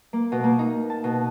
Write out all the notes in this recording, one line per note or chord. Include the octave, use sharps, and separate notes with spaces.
A#3
B2
A#3
D#4
A5
B2